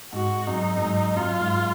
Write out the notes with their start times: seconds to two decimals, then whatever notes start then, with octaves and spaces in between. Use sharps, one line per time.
0.13 G#2 F#4
0.47 F#2 D#4
0.76 F#2
0.82 G#2
1.16 F#2 F4
1.40 G#2